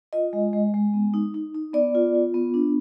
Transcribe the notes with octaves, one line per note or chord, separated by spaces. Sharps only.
F4 D#5
G#3
G#3
G#3
B3
D#4
D#4
D#4
B3 D5
F4
F4
B3
D4